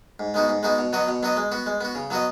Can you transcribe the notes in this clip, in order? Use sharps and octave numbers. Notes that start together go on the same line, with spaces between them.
G#2
G#3 B3 D#4 F#4
G#2
G#3 B3 D#4 F#4
B2
F#3 B3 F#4 D#5
B2
F#3 B3 F#4 D#5
G#3
B3 F#4
G#3
B3 F#4
C#3
F#3 B3 F#4 D#5